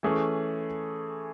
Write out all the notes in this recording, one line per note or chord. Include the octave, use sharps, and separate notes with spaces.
E3 A3 C#4 G#4